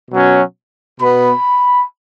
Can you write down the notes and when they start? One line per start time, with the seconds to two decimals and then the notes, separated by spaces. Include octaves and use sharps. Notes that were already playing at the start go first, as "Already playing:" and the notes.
0.10 B2 F#3 C#4
1.00 B2 B3 B5